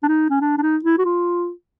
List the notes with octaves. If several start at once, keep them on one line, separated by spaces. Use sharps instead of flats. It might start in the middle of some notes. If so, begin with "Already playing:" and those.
D4
D#4
C#4
D4
D4
D#4
E4
F#4
F4